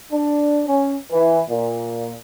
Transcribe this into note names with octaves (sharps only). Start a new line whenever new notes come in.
D4
C#4
E3
A#2